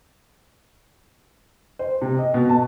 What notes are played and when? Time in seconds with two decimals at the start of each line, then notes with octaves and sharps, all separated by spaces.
1.79 C5
2.02 C3
2.18 D#5
2.34 B2
2.49 A5